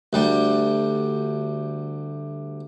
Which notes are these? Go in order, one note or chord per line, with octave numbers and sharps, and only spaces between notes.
D2 G3